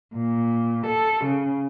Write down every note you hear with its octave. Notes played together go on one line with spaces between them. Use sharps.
A#2
A4
C#3